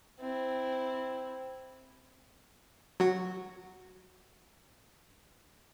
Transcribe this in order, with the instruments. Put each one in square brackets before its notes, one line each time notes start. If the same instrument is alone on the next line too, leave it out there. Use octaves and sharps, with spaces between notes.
[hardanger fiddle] C4 E4
[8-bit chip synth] F#3 F#4